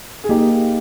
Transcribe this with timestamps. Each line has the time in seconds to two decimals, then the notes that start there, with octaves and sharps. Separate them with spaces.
0.24 G#4
0.29 A#3 D#4 G4